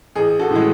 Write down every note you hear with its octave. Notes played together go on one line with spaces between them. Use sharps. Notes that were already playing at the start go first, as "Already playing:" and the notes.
A1 G#4
F#4 A4
A2 E3 G#3